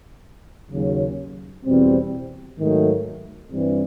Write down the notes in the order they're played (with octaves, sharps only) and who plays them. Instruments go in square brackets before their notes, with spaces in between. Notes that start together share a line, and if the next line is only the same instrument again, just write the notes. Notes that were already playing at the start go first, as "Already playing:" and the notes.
[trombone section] D#2 C#3 F#3
E2 B2 G3 C4
G#2 D#3 F#3 A3
G2 E3 G3 C4